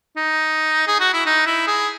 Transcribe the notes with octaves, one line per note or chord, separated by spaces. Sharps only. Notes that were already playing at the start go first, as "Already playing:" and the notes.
D#4
G#4
F#4
E4
D#4
E4
G#4